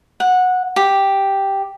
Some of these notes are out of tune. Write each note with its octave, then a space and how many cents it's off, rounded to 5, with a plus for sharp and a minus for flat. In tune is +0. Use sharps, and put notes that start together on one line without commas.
F#5 -15
G4 +0